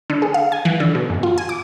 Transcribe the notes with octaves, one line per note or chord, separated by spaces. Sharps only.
D3
G#4
F5
G#5
E3
D3
B2
F#2
F4
G#5
D6